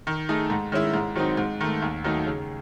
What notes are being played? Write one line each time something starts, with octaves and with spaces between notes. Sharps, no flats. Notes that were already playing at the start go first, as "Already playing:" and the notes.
D#3
A3 D#4 G#4
G#2
D#3 G#3 C#4 E4
G#2
D#3 F#3 C4 D#4
G#2
D#3 A3
D#2
D#3 F#3 A3 D#4
C#3